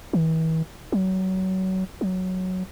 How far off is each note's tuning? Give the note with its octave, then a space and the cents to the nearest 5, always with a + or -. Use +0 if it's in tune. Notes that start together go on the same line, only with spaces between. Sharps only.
E3 -40
F#3 +25
F#3 +0